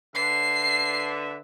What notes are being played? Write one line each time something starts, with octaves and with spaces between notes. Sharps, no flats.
D3 B4 E5 C7